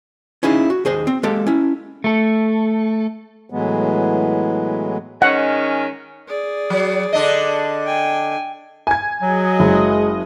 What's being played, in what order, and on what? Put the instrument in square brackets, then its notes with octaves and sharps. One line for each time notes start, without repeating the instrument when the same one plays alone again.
[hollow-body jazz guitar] C#4 D#4 E4 G#4 F5
F#4
D#2 G#4 C5 D#5
C4
G#3 A#3 G4 A4
C#4 E4
[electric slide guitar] A3 A4
[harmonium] A2 E3 F#3 G#3 B3
[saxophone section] D#3 G#3 C#4 [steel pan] F#5
[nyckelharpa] G#4 D5
[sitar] F#3
D3 D4 D#5
[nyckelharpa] G5 G#5
[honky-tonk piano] G#5 G#6
[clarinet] F#3 [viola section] F#4 G#4 D#5
[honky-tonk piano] F#1 [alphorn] G#3